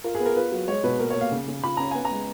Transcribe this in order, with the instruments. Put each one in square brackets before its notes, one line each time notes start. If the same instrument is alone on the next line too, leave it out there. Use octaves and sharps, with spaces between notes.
[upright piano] F4 A#4
G#4
B3
A#4
F4 B4
F#3
G#3 C#5
B2 B4
A#2 A#4
C#5
A#2 F5
C#3
C#3
F4 B5
C#4 A#5
B3 G#5
A#5
G#3